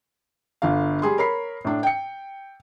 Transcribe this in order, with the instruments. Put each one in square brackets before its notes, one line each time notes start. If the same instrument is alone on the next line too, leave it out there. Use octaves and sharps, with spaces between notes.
[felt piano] G1 D3 F4 F5
G3 G#4 C6
A#4 C#5 B5 C7
A2 D4
G5 C#7